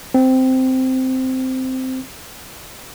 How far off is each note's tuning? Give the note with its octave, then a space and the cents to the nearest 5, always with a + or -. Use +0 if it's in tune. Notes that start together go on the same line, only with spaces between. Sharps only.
C4 -10